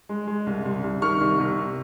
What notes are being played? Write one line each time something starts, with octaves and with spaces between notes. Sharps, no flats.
G#3
G#3
C2
C2
C2
D#3 C#6 F6
C2
C3